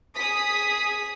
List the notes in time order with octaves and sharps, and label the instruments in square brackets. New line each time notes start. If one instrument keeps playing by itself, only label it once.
[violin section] G#4 D#6 B6